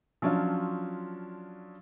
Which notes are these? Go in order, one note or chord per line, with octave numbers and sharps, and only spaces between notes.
F3 F#3 C#4 D4 F4